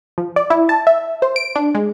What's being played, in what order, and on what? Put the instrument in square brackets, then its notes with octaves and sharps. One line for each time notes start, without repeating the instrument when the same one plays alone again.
[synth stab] F3
D5
E4
A5
E5
C5
D7
D4
G#3